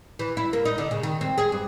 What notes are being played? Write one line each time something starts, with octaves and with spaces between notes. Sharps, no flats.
E3
E4
A#3
D#4
D3
C#3
D#3
C4
G#4
G2